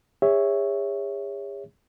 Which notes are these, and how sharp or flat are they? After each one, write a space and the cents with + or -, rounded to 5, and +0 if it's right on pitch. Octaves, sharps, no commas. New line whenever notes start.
G#4 -40 C#5 +0 E5 +0